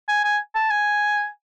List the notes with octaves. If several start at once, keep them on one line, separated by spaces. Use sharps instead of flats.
G#5
G#5
A5
G#5